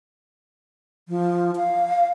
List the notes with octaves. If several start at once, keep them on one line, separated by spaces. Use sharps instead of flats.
F3
F5